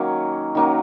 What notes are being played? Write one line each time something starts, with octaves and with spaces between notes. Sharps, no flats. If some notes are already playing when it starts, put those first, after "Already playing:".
Already playing: D#3 F#3 A#3 C#4
D#3 F#3 A#3 C#4